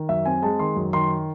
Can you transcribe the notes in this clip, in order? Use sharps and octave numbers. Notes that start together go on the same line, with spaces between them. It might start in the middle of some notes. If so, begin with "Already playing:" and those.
Already playing: D#3
F#2 E5
C4 G#5
G#3 A5
D#3 C6
F#2
D#3 C6